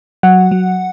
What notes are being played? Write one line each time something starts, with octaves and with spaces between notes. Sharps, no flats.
F#3 F#5
F#3